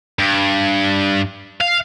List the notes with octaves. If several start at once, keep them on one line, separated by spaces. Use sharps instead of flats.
G2
F5